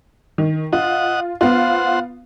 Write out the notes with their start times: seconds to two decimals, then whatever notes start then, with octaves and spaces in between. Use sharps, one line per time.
0.38 D#3
0.73 F4 D#5 F#5
1.41 B3 F4 C5 F#5